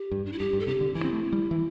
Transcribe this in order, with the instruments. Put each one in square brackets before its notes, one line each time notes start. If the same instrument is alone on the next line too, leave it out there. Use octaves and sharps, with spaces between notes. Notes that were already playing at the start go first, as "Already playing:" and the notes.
Already playing: [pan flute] G4
[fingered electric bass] G2
[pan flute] D4
E4
[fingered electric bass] G2 [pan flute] G4
[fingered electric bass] G2
[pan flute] A4
[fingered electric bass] C3 [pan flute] G4
[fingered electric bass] D3
[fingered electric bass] E3 [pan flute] E4
[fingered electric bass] C4
A3
G3
E3